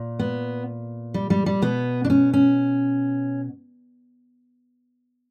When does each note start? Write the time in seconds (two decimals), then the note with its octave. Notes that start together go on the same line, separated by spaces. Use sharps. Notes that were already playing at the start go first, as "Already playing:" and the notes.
Already playing: A#2
0.19 B3
1.14 G3
1.30 G3
1.46 G3
1.62 B2 B3
2.05 D4
2.10 C#4
2.33 C#4